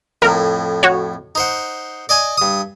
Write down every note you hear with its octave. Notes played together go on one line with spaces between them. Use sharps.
F2 A2 A#4
F#4 C#5
D#4 C5 F#5
D5 D#5 G#5
G2 D#6